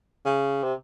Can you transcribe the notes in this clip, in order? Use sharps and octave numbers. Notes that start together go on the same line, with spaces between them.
C#3
C3